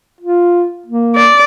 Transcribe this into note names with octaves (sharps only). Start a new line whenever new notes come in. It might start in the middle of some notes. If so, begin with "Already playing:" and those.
F4
A#3
D5